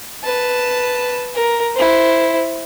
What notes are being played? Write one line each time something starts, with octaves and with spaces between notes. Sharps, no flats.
B4 A5
A#4
E4 C5